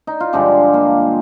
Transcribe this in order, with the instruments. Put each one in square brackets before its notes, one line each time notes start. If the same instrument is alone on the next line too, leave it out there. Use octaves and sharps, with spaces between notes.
[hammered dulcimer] D#4
F4
G2 D3 F3 G#3 G4
A#3